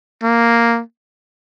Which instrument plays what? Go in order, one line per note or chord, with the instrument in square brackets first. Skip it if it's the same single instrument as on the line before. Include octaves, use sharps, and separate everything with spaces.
[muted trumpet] A#3